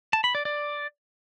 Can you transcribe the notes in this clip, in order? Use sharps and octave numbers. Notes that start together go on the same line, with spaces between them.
A5
B5
D5
D5